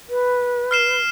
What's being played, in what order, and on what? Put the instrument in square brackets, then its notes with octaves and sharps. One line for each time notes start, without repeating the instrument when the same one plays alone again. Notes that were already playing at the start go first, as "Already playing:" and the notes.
[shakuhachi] B4
[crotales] F6 C7 E7